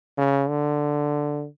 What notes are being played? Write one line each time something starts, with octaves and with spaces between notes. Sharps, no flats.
C#3
D3